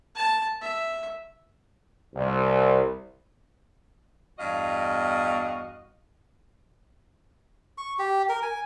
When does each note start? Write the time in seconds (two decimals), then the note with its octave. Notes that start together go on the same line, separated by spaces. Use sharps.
0.15 A5
0.61 E5
2.16 C2
4.38 E2 G2 F#4 D#5 F5
7.78 C#6
7.99 G4
8.29 A#4
8.42 G#5